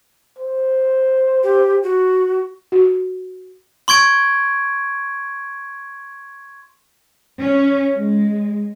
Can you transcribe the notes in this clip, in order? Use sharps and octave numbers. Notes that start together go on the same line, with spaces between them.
C5
G4
F#4
F#4
C6 C#6 G#6 D7
C#4
G#3